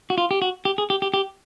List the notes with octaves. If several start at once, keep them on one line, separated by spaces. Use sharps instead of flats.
F#4
F4
G4
F#4
G4
G#4
G4
G4
G4